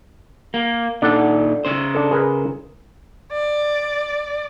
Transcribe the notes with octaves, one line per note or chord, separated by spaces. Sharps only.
A#3
A#2 D4 D#4 A4 F#5
C#3 C5
D4 A4
G#4 A#4 B4
D5